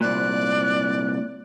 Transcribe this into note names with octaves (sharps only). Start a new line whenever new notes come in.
C2 A#2 D5 F#6